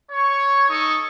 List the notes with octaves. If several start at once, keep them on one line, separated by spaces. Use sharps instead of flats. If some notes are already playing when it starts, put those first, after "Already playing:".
C#5 C#6
D#4 A4 C#6 D#6